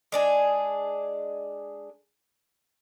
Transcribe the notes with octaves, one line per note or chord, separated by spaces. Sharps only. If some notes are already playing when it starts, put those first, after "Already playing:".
G#3 D4 G#4